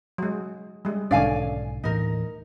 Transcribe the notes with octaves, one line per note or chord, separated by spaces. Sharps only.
F#3 G#3
G3 G#3
B1 G#2 D3 D#3 C#4 D5 F5 G#5
D#1 A2 E3 D#4 A#4